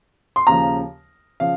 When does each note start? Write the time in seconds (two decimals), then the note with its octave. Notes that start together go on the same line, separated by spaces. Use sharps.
0.36 C6
0.47 D#2 C#3 F3 A#5
1.40 C#3 F3 F5